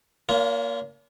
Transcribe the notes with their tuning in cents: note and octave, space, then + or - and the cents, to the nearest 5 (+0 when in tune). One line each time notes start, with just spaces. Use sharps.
A#3 +10 C#4 +45 F4 -30